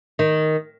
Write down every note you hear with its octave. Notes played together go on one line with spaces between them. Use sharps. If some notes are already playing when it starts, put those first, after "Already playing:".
D#3